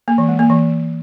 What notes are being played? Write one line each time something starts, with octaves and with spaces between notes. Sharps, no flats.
A#3
E3
G#3
A#3
E3